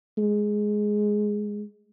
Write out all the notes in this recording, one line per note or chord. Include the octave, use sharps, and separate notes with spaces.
G#3